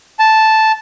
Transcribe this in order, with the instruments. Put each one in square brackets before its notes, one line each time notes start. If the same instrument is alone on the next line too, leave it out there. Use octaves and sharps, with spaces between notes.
[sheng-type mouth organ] A5